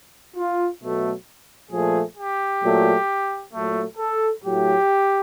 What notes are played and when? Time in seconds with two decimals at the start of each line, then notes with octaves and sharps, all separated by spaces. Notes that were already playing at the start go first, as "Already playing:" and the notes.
0.36 F4
0.82 B2 F#3 A3
1.71 A#2 F3 A3 G#4
2.18 G4
2.63 A#2 F#3 A3
3.54 A#2 F#3 A3
3.98 A4
4.43 A2 F#3 A3 G4